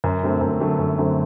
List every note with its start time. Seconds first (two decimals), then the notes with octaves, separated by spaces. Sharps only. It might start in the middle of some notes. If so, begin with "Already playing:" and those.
0.04 F#2
0.23 D3 F#3 A3 C4
0.41 F#2
0.60 D3 F#3 A3 C4
0.79 F#2
0.98 D3 F#3 A3 C4